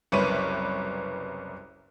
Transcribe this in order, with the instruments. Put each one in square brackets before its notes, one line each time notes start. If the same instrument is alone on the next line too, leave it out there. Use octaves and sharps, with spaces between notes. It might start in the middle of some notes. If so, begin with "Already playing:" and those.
[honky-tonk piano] F#1 C2 B4 C#5 D#7